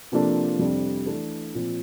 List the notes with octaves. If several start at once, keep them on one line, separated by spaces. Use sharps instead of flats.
C3 F3 A#3 D4 A4
F2 C3 G3 D4 G4
E3 A3 D4
A#2 F3 C4 F4